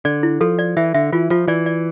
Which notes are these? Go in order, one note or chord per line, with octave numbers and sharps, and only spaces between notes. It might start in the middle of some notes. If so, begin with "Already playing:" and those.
D3 D5
E4
F3 A4
D5
E3 E5
D3 E5
E3 F4
F3 F4
E3 D5
D5